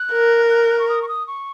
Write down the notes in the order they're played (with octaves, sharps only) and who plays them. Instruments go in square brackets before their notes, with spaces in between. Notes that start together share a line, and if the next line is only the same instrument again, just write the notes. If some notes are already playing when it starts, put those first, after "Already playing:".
Already playing: [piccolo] F#6
[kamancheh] A#4
[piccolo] F#6
F#6
C#6
D#6
C#6
D#6
C#6